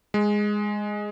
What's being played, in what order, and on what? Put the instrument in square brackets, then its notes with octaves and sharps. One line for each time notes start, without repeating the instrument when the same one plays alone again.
[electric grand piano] G#3